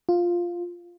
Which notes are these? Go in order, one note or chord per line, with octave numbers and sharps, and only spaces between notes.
F4